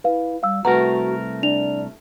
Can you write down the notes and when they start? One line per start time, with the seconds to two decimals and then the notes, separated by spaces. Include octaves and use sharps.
0.04 E4 B4 F5
0.43 G3 F5 E6
0.65 C2 A3 F#4 A#4 B4 F#5 A#5
1.43 D4 D5 F7